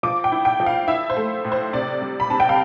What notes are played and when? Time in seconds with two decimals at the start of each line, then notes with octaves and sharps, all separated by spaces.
0.03 F3 D6
0.24 G5
0.32 E4
0.45 G5
0.60 F3
0.66 F5
0.88 E4 E5
1.10 C5
1.17 A3
1.45 A2
1.52 C5
1.73 C3 D5
2.02 G3
2.20 B5
2.30 C3 A5
2.40 G5
2.49 F5